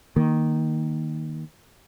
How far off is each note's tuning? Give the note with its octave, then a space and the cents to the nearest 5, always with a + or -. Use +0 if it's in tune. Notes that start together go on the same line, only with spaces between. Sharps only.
D#3 +0 A#3 +0